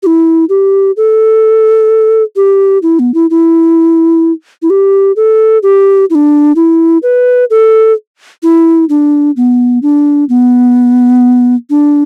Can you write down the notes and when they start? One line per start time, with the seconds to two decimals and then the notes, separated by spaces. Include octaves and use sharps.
0.03 G4
0.06 E4
0.49 G4
0.97 A4
2.36 G4
2.83 E4
2.99 B3
3.14 E4
3.30 E4
4.62 E4
4.70 G4
5.16 A4
5.63 G4
6.10 E4
6.15 D4
6.56 E4
7.03 B4
7.50 A4
8.43 E4
8.89 D4
9.37 B3
9.83 D4
10.29 B3
11.70 D4